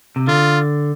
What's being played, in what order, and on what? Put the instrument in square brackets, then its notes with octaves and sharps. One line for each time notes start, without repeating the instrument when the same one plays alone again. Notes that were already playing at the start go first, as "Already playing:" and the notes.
[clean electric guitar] C3
[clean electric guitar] D3 [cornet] F4